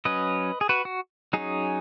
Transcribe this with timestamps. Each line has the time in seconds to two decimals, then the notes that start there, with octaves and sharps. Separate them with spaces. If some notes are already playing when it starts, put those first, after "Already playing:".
0.05 F#3 C#4 B4 D#5
0.61 G#4
0.69 F#4 B4
0.85 F#4
1.33 F#3 C#4 D#4 G#4